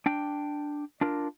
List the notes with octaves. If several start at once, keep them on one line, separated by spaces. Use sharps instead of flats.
D4 G5
D4 F4 A#4